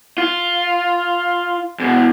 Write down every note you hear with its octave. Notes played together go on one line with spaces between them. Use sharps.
F4
E2 B2